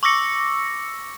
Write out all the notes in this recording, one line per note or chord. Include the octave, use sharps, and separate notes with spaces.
C#6 D6 E6 A#6 C#7